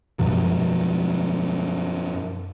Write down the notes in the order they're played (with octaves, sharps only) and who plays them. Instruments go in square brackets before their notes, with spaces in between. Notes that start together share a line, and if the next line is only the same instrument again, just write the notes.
[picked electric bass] F#2 B2 F3 F#3